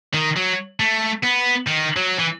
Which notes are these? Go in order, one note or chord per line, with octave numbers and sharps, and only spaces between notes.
D#3
F#3
A3
B3
D#3
F#3
E3